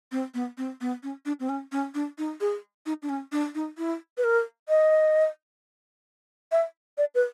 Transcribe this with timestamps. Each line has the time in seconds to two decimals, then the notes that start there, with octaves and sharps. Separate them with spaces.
0.12 C4
0.34 B3
0.58 C4
0.81 B3
1.03 C#4
1.26 D4
1.40 C4
1.49 C#4
1.72 C#4
1.95 D4
2.18 D#4
2.41 G#4
2.86 D#4
3.02 D4
3.09 C#4
3.32 D4
3.55 D#4
3.78 E4
4.17 B4
4.24 A#4
4.69 D#5
6.52 E5
6.98 D5
7.15 B4